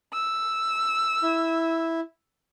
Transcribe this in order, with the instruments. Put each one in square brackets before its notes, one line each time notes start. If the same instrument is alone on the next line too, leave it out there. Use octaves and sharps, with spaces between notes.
[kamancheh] E6
[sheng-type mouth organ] E4